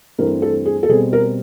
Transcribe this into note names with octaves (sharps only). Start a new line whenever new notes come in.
G2 E3 A3 C4 A#4
A4
G#4
A4
B2 G3 C4 G#4
A#4